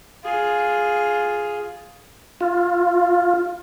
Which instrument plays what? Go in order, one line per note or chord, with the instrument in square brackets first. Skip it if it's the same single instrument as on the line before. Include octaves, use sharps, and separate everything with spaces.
[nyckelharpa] F4 G#4
[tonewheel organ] F4